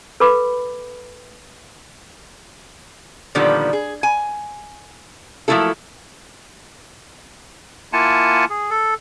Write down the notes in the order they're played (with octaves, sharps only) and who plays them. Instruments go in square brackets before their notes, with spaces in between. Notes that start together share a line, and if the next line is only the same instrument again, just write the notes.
[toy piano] A4 B4 B5 D6
[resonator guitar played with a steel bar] A#2 D3 D#3 F3 G3 B3
G#4
G#5
F3 F#3 A3 A#3 E4 A4
[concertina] A#3 E4 F4 F#5 G#5 A5
G#4
A4